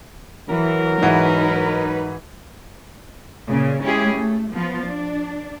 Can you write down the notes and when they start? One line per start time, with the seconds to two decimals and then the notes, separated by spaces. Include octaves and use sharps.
0.49 E3 F#3 A#4
1.02 G#2 E3 D#4 F#4 B4
3.48 A#2 C#3
3.82 G#3 C#4 E4 G4 G#4
4.15 A3
4.51 F3 B3 F4
4.87 D4